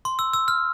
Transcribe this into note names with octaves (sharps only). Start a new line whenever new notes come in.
C6
E6
E6
F6